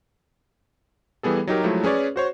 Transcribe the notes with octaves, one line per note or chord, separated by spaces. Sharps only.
E3 G3 B3 G#4 A4
F#3 D#4 G4 A#4
F3 F#3 G#3 A3 E4 F#4
C#4 G#4 B4 C#5 D5
F#4 C5 C#5